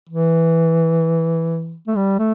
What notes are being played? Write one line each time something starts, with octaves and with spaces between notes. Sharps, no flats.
E3
A3
G3
A3